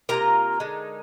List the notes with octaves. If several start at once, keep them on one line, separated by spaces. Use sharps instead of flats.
C3 G3 A#3 F4 A#4 A#5
D3 G#3 D#4